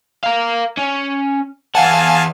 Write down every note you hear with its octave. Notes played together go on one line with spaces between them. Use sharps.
A#4 F5
C#4
E3 F5 F#5 G#5 A5